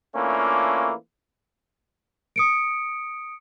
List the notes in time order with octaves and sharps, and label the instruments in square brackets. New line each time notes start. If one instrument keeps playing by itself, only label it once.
[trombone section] E3 A3 A#3 C#4 D4 F4
[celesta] D#6 C#7 D7